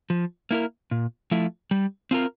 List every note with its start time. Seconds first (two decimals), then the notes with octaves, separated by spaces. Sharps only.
0.10 F3
0.51 A#3 E4 A#4
0.91 A#2
1.31 F3 A3 E4
1.71 G3
2.11 C4 F4 A#4